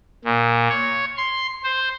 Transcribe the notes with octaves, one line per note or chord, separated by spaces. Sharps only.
A#2
C#5
C6
C5